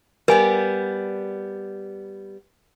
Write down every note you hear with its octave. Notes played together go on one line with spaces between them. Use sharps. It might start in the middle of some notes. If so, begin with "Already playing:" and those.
G3 B3 A#4 G#5